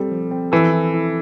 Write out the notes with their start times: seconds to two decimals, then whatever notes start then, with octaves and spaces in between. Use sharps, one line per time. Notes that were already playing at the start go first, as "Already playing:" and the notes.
Already playing: G3 C4 A4
0.11 F3
0.31 C4
0.52 E3 A4
0.72 E4
0.94 E4